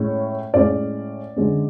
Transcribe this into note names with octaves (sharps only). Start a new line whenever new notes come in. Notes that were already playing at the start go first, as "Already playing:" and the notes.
Already playing: A2 G#3 C#4 C#5
A2 G#3 C#4 D5
D3 G#3 C#4